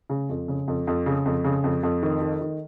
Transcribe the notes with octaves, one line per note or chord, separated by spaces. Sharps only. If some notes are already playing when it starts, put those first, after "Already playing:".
C#3
F2
C#3
F2
F2
C#3
F2
C#3
F2
F2
D#3
D#3
D#3